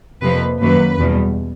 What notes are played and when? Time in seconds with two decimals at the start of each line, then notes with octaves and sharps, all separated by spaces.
0.22 F2 C3 F3 A#3 B4
0.61 F#2 D#3 F#3 A#3 B4
0.98 E2 B2 G3